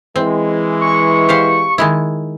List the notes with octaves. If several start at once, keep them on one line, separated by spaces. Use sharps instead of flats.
E3 G#3 C4
C#6
G4 C5 F5
D#3 G#3 E4